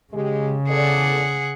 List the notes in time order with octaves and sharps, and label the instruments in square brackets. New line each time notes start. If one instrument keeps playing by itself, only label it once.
[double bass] C#3 [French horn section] G#3 G4
[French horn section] E2 A4 D5 [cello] G#4 F#5